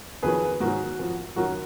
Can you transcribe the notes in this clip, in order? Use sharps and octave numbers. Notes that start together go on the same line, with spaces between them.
F2 D#3 F#3 G#4 B4
G#2 D#3 F#3 F#4 A#4
F2 F3
F#2 D#3 F#3 F#4 A#4